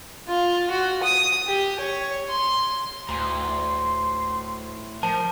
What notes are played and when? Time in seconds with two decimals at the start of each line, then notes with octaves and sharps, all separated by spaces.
0.28 F4
0.70 F#4
1.03 D#6
1.47 G4
1.80 C#5
2.29 C6
3.09 D2 A2 G#5 A#5 C6
5.03 F3 A#4 A5